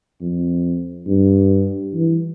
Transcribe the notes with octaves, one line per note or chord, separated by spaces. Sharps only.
F2
G2
E3